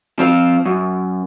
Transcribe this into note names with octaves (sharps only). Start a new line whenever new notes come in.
F3 C4 F4
F#2